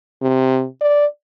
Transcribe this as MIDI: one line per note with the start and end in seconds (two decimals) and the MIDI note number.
0.22 0.65 48
0.81 1.06 74